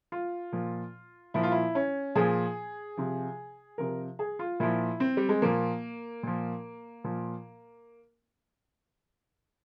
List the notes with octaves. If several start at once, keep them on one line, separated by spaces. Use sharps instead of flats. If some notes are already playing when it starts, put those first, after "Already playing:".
F4
A#2 F3
A#2 F3 E4
F4
E4
C#4
A#2 F3 G#4
C3 F3
C3 F3 A#4
G#4
F4
A#2 F3 E4
C4
G3
G#3
A#2 F3 A#3
A#2 F3
A#2 F3